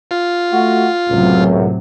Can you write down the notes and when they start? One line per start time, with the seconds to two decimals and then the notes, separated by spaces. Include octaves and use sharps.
0.11 F4
0.51 A3 F#4
1.09 C#2 F#2 A2 C3 F#3